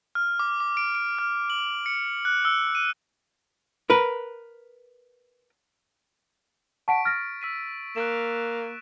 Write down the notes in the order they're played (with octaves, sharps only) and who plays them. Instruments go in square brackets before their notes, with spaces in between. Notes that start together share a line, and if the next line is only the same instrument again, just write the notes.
[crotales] F6
D6
D6
D7
D7
F6
F#7
C#7
F#6
E6
D#7
[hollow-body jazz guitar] A#4 B4
[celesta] F#5 A5 [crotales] C#6 B6 D7
[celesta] F6 A#6 [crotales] A6
[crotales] E6 B6 D#7
[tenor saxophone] A#3 [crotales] F#6 D7 E7